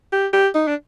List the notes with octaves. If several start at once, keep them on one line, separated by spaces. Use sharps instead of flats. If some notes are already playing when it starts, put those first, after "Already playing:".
G4
G4
D#4
D4